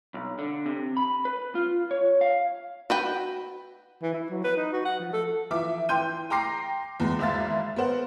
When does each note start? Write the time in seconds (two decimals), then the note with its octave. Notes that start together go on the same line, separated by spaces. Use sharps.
0.14 B1
0.39 D3
0.66 C3
0.97 B5
1.25 B4
1.55 F4
1.91 C#5
2.21 F5
2.90 F#4 B4 G5
4.02 E3
4.14 E4
4.30 F#3
4.44 B4
4.57 D#4
4.73 F#4
4.85 F#5
5.00 F3
5.13 A4
5.50 E3 F3 E5 D6
5.89 E3 G5 C6 G6 D#7
6.30 G5 A#5 C6 D6 A#6 C7
7.00 E2 G#3
7.19 G#1 G#3 E5 F5 A6
7.76 B3 A#4 C5 F#5